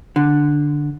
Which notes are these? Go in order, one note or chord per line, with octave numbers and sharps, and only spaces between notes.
D3